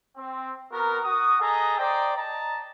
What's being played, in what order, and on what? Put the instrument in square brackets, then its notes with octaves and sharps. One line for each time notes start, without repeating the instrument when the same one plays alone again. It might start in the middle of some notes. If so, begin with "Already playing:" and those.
[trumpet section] C4
B3 F#4 A#4
F#4 D#6
G#4 A4 D#5 A#5
C5 D5 D#5 G5 A#5
D#5 A5 A#5